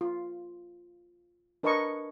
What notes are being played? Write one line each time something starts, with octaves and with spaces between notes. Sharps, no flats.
F4
D4 A#4 B4 D#5 A5 C#6